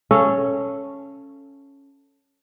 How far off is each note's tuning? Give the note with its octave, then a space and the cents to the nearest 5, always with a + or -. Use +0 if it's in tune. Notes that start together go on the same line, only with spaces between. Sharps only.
C#4 +0 A4 +0 F5 -30